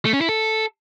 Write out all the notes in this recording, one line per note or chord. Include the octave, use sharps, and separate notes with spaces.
A3
C#4
E4
A4